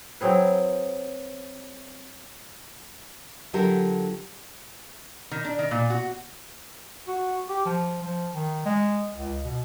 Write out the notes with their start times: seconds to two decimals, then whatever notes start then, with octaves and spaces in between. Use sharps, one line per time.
0.21 F#3 C4 G#4 B4
3.53 D3 F#3 F4 G4 A4 A#4
5.31 D#3
5.45 D4
5.59 D#3
5.71 A#2
5.90 F#4
7.08 F#4
7.49 G4
7.65 F3
8.02 F3
8.34 D#3
8.66 G#3
9.15 C#2
9.44 B2